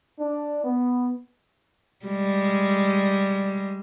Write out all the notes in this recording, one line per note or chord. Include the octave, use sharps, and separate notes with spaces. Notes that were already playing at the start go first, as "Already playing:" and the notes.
D4
B3
G3 G#3